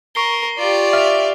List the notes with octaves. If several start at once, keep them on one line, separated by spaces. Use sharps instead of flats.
A#4 C#6 C7 G7
F4 G4 D5
E5 F6 F7